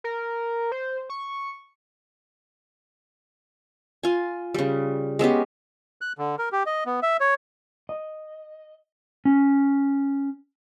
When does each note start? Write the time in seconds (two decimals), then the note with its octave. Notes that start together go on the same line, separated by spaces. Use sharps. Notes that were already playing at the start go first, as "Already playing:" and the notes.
0.04 A#4
0.72 C5
1.10 C#6
4.03 F4 G#5
4.54 C#3 G3
5.19 G#3 B3 C#4 G4
6.01 F#6
6.18 D3
6.39 A#4
6.52 G4
6.66 D#5
6.86 B3
7.03 E5
7.20 C#5
7.89 D#5
9.25 C#4